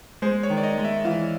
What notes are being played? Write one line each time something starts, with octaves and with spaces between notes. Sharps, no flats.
G#3 C5
C#5
D#3
D5
D#5
G#3
E5
E3 F5